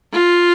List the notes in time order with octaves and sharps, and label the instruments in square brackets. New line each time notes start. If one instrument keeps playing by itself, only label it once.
[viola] F4